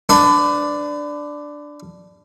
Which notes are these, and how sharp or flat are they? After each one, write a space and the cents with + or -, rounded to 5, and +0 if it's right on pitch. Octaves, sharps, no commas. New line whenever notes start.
D4 +0 B4 +35